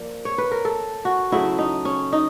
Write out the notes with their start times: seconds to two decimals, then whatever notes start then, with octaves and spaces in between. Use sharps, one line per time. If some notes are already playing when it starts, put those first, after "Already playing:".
Already playing: F3 A#3 D5
0.25 C#5
0.38 B4
0.52 A#4
0.65 A4
1.05 F#4
1.32 C#3 F#3 A3 E4
1.58 D#4
1.85 C#4
2.12 D#4